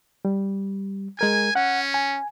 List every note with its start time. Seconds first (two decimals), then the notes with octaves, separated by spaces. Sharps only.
0.25 G3
1.19 G#3 A#4 G#5 G#6
1.55 C#4 F#5
1.94 G#5